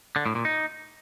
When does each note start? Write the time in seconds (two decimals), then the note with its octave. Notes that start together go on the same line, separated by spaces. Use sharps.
0.16 D3
0.26 A2
0.35 A#2
0.45 D#4